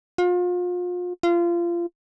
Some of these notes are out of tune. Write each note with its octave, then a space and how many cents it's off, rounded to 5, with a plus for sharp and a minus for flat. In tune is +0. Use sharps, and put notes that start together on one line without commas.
F4 +35
F4 -25